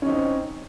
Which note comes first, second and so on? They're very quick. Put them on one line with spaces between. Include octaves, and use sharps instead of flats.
C#4 D#4 C4